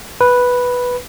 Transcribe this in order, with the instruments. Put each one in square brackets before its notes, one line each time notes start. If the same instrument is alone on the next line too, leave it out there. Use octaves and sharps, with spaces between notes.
[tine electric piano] B4